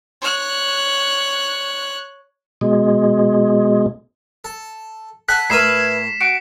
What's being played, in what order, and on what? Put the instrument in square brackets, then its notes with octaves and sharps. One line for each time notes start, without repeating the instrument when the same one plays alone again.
[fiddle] C#5 F#6
[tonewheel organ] B2 G#3
[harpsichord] A4
[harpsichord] A4 F#5 G#5 [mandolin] F#6 [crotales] B6
[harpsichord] A2 A#4 [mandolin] B4 E5 B5 [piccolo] G#6 [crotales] C7 E7
[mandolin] F#4 [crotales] C#7 [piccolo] D7